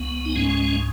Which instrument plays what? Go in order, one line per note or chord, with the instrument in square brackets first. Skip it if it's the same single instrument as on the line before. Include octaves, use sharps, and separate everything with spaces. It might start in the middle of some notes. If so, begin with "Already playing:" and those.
Already playing: [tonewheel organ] C#2 B3
D#4
G#2 G#3 C#4